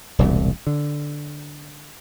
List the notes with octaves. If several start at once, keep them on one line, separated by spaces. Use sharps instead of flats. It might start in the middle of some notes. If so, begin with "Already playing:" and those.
E1 C2 A#2
D3